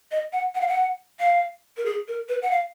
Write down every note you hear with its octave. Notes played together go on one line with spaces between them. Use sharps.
D#5
F#5
F#5
F5
F#5
F5
A#4
G#4
A#4
B4
F#5
F5